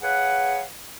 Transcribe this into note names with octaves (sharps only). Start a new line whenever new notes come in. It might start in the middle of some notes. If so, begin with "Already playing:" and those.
G#4 B4 C#5 F5 F#5